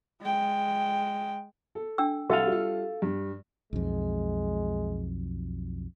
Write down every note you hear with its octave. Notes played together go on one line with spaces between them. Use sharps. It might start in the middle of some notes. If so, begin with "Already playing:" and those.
G#3 G5
A4
D4 G5 E6
C2 F#4 A4 E5 F5 A5
G3 F4
G2
B1 F2 G#3